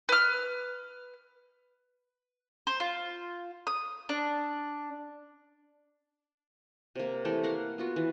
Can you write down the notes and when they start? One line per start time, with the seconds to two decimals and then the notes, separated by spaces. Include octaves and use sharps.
0.09 B4 F6
2.67 C5
2.80 F4
3.67 D#6
4.09 D4
6.96 C3 A#3
7.25 E3 A3 G4 A4
7.43 A#3 F5 F#5 A#5
7.78 B3 F4 F#4
7.96 E3